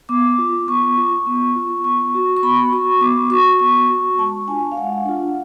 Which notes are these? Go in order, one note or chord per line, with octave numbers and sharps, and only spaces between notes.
B3 D6
F4
B3 C#6
F4
B3
F4
B3 C#6
F#4
C#6
B3 B5
F#4 C#6
B3 D6
F#4 C#6
B3 C#6
F#4
G#3 A5
D4 F4 G#5
F5
G#3 F#5
D4 F4